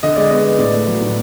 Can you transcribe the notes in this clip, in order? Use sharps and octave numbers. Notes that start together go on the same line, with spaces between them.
D3 D#5
G#3 D5
B3 D#5
B3
A2 D5
A3
F#3
A2